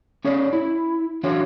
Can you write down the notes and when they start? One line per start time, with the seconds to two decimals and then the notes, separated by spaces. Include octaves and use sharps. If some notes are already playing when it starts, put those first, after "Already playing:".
0.25 C#4 G#4 C#5 D5
0.53 E4
1.23 E3 F#3 D4 F4 F#4 C#5